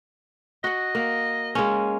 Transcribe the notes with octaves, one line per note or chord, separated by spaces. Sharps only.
F#4 D#5 F#5
A#3
G#3 A#3 C#4